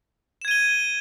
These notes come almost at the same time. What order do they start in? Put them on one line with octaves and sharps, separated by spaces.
E7 G#6 D#7 G7